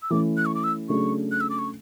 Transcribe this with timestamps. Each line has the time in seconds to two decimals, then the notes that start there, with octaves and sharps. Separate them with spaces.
0.02 E6
0.10 E3 A3 C#4 D6
0.37 F#6
0.46 C#6
0.55 D6
0.64 E6
0.89 C#3 F#3 A3 D4 C#6
1.32 F#6
1.41 E6
1.50 D6
1.59 C#6